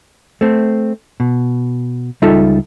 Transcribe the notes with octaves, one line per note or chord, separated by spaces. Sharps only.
A3 C4
B2
C#2 G3 D#4 F4 A4 E5